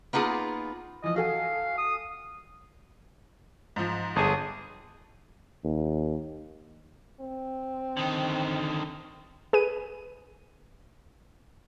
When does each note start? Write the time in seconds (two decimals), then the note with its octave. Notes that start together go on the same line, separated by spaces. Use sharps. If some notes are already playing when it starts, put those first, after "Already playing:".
0.13 A#3 B3 D#4 F4 G#4
1.04 E3 F3 D#5
1.16 F#4 A4 F5 G#5
1.78 D#6
3.76 G#2 F3
4.16 G1 G#4 A5
5.64 D#2
7.21 C4
7.97 D3 D#3
9.53 G#4 B4 D#7